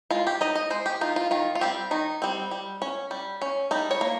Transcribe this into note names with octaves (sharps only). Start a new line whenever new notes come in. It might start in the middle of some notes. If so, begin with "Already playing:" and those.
G#3 F4
G4
D#4 D#5
D#5
G#3 C5
G4
D#4 F4
F4
D#3 F4
F4
G3 C4 G4
D#3 D#4
G3 C4
G3
C#4
G3
C#4
G3 D#4
C#5
A#3